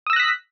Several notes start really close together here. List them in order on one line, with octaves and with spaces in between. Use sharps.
D#6 E6 A#6 F#6 B6